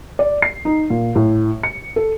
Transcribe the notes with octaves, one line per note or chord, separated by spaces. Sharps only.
D5
C7
D#4
A#2
A2
C#7
A4